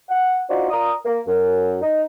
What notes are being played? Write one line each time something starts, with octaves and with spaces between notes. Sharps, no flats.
F#5
D4 D#4 F4 F#4 C5 D5
F4 A#4 D5 A#5 D#6
A#3
F#2
D#4